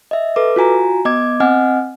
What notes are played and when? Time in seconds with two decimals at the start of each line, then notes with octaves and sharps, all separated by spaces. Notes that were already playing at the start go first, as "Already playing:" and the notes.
0.11 D#5 E5
0.36 A4 B4 D6
0.56 F4 F#4 G#5 A#5
1.05 B3 D#5 D6 G#6
1.40 C4 D#5 F#5 G#5 F6